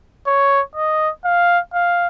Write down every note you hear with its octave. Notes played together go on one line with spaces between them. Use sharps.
C#5
D#5
F5
F5